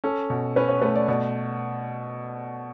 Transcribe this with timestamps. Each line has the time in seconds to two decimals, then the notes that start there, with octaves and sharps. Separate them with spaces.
0.04 C#4 A4
0.30 B2
0.56 C#4 B4
0.69 C#5
0.81 A3 B4
0.96 D5
1.08 B2 D5